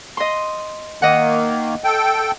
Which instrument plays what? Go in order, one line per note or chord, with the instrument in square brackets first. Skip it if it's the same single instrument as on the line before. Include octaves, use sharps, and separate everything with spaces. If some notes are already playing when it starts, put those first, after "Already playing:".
[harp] D#5 C6
[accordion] D#3 A#3 [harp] D#5 F#5
[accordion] A4 G5